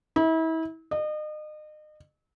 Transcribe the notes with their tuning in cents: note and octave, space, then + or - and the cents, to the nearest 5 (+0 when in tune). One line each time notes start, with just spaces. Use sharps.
E4 -35
D#5 -35